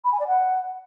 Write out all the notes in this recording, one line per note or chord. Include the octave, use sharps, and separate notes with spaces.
B5
G#5
D5
F#5